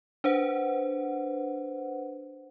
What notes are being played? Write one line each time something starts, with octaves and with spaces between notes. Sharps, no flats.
D4 B4 C5 F#5